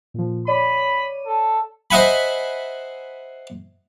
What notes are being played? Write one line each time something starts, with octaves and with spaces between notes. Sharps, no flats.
A#2 F3
C#5 D5 B5 D#7
A4
C5 D#5 E5 F#5 G#5 B5